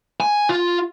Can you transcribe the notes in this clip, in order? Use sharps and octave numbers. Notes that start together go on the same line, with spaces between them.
G#5
F4